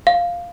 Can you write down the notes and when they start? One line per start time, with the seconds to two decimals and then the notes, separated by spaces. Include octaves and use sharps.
0.07 F5